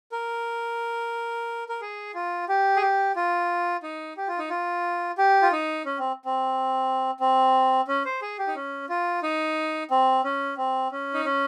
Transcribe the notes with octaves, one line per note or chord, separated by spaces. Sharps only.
A#4
A#4
G#4
F4
G4
G#4
G4
F4
D#4
G4
F4
D#4
F4
G4
F4
D#4
C#4
C4
C4
C4
C#4
C5
G#4
G4
D#4
C#4
F4
D#4
C4
C#4
C4
C#4
D#4
C#4